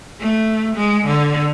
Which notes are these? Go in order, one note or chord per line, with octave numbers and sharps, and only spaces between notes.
A3
G#3
D3